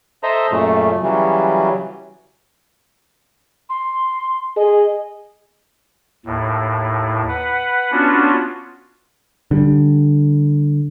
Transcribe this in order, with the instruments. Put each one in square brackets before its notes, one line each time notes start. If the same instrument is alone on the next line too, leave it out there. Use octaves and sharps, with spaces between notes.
[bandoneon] A4 C5 D#5 E5 A#5
F#2 A#2 C#3 A3
C#3 E3 F#3 G3
[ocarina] C6
[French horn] G#4 [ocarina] D#5
[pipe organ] D#2 A2
B4 F#5
B3 C#4 D4 F4 F#4
[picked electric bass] D3 G3